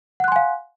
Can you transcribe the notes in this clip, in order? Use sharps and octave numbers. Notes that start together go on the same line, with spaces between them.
F5 F#5 G#5 C6 F#6